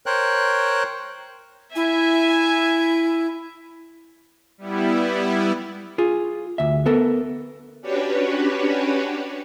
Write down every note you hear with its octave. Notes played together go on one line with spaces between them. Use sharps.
A#4 C5 C#5 G5 F#6
E4 E5 G#5
G3 B3 E4
F4 G#4
D2 E5
B3 A4 A#4
C#4 D4 F#4 G4 B4 C#5